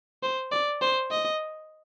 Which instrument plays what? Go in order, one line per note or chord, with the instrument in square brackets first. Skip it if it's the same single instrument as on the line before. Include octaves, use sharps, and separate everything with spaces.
[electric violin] C5
D5
C5
D#5